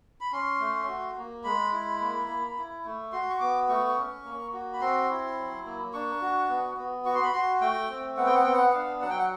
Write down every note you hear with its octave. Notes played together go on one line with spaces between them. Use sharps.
B5
C#4 C6
A3
F#4
A#3
G#3 B5
E4
A#3
A#3
E4
A3
F#4 C6
C#6
B3 D6
A3 C#6
C#4
A#3
F#4
B5
C4 C6
E4
F#3
A#3
D4 C#6
F#4
B3
B3
F#4 C#6
C6
B5
F#4 C6
A3 G5
C4
B3 F#5
G5
F#5
B3 G5
F#5
F#5
D4 F5
F#3 F#5
G5
F#5